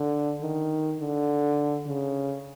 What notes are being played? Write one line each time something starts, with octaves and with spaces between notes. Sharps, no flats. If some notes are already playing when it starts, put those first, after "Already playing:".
Already playing: D3
D#3
D3
C#3